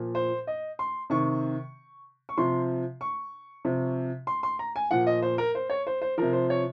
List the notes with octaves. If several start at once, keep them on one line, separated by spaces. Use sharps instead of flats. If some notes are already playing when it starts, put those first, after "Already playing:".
Already playing: A#2 F3
C5
D#5
C6
C3 D#3 C#6
C#6
C3 F3 C6
C#6
C3 F3
C6
C6
A#5
G#5
A#2 F3 F#5
D#5
C5
A#4
C5
C#5
C5
C5
C3 F3 A#4
C5
C#5